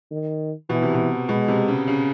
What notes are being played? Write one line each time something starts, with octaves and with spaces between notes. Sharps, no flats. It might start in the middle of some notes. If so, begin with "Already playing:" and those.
D#3
B2 E3
C3
B2
B2 G#3
C3
C#3
C#3